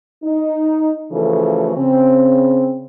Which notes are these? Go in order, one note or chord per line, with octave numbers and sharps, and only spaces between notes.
D#4
C#3 E3 F3 A3 F#4 A4
C#3 C4